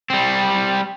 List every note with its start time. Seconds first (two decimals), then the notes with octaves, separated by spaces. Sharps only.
0.10 G3 C4